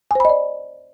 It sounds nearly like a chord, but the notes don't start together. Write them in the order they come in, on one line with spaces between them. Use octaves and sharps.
G#5 C5 B5 D#5 D5